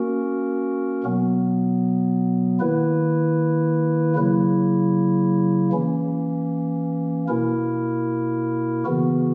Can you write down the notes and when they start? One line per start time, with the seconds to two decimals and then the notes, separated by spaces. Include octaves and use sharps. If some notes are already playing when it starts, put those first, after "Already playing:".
Already playing: A#3 C#4 F#4 A#4
1.04 B2 F#3 B3
2.60 D#3 A#3 E4 B4
4.16 C#3 F#3 A#3 E4
5.73 E3 A#3 C#4
7.28 B2 A#3 E4 A#4
8.85 C#3 E3 B3 F#4